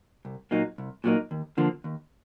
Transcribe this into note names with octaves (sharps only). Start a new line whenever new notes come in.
C2
A#2 F#3 A#3 D#4
C2
A#2 F#3 A#3 D#4
D#2
D3 F3 A#3
D#2